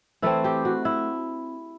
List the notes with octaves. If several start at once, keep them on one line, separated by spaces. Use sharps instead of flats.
E3 A3 C4 E4
G4
F#4
E4